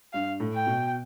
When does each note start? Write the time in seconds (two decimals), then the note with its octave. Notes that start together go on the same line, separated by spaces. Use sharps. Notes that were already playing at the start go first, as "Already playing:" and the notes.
0.13 G2 F5
0.40 A2
0.53 G5
0.67 B2